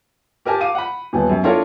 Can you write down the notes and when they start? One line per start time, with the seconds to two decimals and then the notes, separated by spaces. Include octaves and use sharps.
0.45 G4 A#4 G#5 A5
0.60 F5 D6 D#7
0.75 F#5 B5
1.13 D#1 B3
1.29 F#2
1.43 D4 E4 F4 A4 A#4 C#5